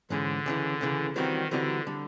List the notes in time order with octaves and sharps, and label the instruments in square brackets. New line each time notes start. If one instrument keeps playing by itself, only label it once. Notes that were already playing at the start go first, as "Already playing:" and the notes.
[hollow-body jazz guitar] G#2 E3 G#3 C#4 [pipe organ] D3
[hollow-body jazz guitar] C#2 C#3 E3
C#2 C#3 E3
[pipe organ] D#3 [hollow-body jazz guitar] E3 G3 C4 D#4 F#4
[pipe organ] D3 [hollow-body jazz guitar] E3 G3 C4 D#4 F#4
[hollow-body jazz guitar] D3 G3